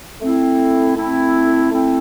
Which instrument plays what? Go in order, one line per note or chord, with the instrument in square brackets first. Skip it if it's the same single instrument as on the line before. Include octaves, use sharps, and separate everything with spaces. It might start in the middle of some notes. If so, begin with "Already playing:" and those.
[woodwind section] A3 C4 E4
A3 C4 E4
A3 C4 E4